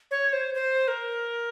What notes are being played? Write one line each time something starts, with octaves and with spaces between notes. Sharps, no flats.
C#5
C5
C5
A#4